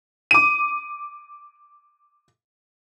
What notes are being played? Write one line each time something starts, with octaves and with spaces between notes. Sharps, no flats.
D6 D#7